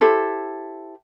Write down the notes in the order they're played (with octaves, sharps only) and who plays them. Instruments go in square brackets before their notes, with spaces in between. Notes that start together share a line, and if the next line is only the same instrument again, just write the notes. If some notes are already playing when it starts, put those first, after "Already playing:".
[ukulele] E4 G4 A4 C5